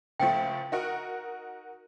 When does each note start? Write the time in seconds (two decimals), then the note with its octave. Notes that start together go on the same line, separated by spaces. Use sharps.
0.20 C#2 F3 A3 G5
0.72 D#4 F#4 A#4